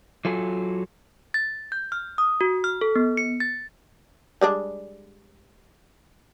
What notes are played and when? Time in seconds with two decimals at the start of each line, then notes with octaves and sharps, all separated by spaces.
0.25 F#3 F4 A4 G#5
1.34 A6
1.72 G6
1.92 F6
2.18 D#6
2.41 F#4
2.64 F6
2.81 A4
2.95 B3
3.17 C#7
3.40 A6
4.41 G3 G#3 D4